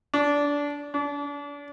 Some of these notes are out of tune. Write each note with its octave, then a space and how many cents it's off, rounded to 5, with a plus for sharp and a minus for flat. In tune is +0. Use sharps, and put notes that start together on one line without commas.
D4 -20
D4 -35